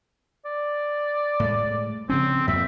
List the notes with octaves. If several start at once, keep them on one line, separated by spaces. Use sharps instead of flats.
D5
A2 G#3
C#3 F3 C4 C#4
F2 A#2 E5